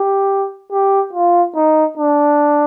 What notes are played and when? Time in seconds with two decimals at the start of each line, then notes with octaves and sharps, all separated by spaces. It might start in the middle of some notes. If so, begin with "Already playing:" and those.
Already playing: G4
0.72 G4
1.13 F4
1.56 D#4
1.98 D4